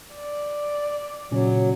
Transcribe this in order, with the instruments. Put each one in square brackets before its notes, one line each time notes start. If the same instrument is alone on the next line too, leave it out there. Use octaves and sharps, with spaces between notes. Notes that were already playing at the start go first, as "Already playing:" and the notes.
[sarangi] D5
[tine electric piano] A#2 C#3 C#4 [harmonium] F#3